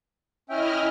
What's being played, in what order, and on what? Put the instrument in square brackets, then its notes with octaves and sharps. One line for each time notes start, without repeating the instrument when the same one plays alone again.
[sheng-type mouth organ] C#4 E5 G5 [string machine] E4 D#5 F6